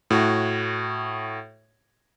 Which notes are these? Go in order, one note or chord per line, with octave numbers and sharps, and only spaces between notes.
A2 F#4